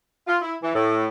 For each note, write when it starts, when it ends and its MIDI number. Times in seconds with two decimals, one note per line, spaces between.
0.27 0.37 65
0.41 0.55 64
0.62 0.73 52
0.74 1.07 45